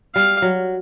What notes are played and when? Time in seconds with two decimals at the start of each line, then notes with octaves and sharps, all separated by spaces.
0.15 G3 F5
0.42 F#3